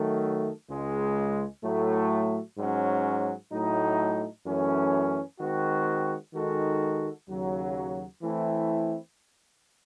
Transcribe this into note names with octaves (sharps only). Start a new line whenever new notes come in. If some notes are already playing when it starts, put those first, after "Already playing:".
Already playing: D#3 F#3 A3
C#2 C#3 G#3
A2 F#3 A3
G#2 F#3 C#4
A2 F#3 A3 D#4
F#2 E3 A3 C#4
D#3 G#3 C4 F#4
D#3 G#3 D#4 F#4 A4
D#2 C#3 F#3
E3 A3 C4 E4